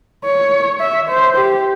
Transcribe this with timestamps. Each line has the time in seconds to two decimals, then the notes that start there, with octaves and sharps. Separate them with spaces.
0.25 C#5
0.80 E5
1.09 C5
1.37 G4